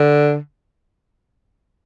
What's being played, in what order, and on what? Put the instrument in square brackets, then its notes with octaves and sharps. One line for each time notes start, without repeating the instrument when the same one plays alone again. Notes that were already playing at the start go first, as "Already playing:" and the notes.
Already playing: [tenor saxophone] D3